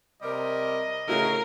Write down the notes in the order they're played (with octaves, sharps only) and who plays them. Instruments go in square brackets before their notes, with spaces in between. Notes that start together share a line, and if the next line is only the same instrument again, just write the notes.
[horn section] C3 G3 A#4 [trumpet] D#5
[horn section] A2 C#3 [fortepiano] A3 E4 F#4 [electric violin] A#4